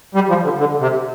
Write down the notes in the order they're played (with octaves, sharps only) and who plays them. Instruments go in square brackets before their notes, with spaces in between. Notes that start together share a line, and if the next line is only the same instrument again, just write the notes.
[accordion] G3
F3
D3
D3
C3